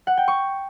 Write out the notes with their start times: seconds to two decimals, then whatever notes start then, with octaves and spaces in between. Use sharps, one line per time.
0.07 F#5
0.17 G5
0.28 C#6